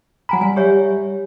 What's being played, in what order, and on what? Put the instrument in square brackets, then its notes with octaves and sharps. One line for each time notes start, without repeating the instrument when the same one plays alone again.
[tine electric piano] F#3 B5 [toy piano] F#5 G#5 A#5
[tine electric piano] G3 [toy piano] G#5
[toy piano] G4 C#5 E5